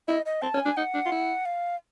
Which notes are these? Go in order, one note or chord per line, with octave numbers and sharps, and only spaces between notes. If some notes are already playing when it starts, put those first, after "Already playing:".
E4 D#5
D#5
C4 A5
C#4
G#5
D4
D#4 F#5
D4
F4
E4
F5